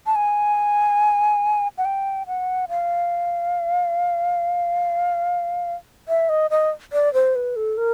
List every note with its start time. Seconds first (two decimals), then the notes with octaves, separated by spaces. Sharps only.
0.06 A5
0.15 G#5
1.78 F#5
1.85 G5
2.27 F#5
2.69 F5
6.08 E5
6.29 D#5
6.51 D#5
6.93 D5
7.14 C5
7.36 B4
7.56 A4
7.77 A#4